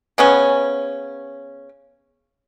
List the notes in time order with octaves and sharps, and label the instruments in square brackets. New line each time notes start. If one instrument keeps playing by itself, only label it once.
[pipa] C#3 B3 C#4